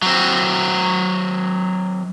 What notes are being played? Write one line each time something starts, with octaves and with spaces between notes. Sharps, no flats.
F#3 C4